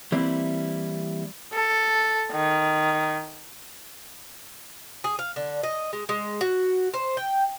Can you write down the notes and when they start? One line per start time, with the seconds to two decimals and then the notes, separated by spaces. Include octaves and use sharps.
0.12 E3 G3 A#3 C4 E4
1.53 A4
2.32 D#3
5.04 G#4
5.19 F5
5.36 D3
5.63 D#5
5.93 G#3
6.09 G#3
6.41 F#4
6.94 C5
7.17 G5